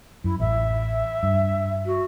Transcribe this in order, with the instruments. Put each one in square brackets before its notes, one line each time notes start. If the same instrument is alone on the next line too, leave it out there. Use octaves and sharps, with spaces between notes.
[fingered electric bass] F#2 [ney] E4
[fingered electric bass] A1 [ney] E5
[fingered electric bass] G2
[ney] F#4